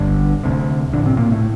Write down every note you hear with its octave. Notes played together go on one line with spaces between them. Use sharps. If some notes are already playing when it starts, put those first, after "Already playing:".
Already playing: G1 G2 D3
D2 C3
A#1 A2 D3 D4
C3 C4
A#2 A#3
A2 A3